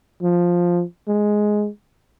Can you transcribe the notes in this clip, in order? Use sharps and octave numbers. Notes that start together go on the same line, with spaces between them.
F3
G#3